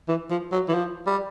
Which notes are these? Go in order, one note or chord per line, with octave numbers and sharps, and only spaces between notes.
E3
F3
F#3
E3
F3
G3